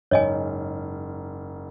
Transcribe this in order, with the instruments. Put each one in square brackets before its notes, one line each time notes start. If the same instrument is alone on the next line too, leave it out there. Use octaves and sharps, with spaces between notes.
[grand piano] F#1 G#2 [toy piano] C#5 D#5 G#5